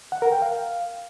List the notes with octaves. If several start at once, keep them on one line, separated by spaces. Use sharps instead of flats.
F#5
A#4
G5
F5